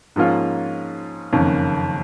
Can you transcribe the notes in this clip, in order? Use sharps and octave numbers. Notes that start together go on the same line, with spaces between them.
G#2 F3 A#3 C#4 F4
F#1 F2 D#3 A#3 C#4